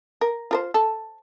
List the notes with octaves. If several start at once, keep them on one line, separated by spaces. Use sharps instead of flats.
A#4
F4 A#4 C5
A4